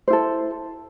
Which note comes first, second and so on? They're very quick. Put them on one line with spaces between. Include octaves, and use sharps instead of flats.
C5 E4 A4